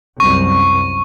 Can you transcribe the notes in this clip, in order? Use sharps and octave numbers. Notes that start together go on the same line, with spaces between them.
C2 F#2 C#6